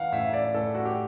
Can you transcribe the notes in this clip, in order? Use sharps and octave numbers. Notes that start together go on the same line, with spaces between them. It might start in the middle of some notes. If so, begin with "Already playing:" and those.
Already playing: E3 F5 F#5
A2 E5
D5
A2 A4
F#4
G4